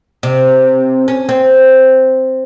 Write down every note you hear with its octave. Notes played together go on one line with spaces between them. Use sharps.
C3
C#4
C4